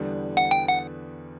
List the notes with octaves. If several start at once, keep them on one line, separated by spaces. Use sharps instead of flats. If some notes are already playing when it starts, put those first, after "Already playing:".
Already playing: E2 D3 G3 B3 D4
F#5
G5
F#5